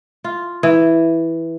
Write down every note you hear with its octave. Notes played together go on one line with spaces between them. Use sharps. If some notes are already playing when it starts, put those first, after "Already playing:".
F4
E3